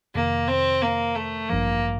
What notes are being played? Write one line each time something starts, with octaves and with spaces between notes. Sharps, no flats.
F2 C3 D#3 A#3
C4
A#3
A3
A1 G2 F3 A#3